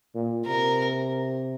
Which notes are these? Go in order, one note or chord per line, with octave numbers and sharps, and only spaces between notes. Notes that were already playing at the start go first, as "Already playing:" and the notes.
A#2
C3 A#4